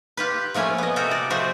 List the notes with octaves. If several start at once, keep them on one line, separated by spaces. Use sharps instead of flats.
F4 G4 B4
F3 A3 A#3 C#4 G#5
B3 D#5
C3 F#4 A4 A#4 G5
D5
F3 G#3 A3 F#4 C5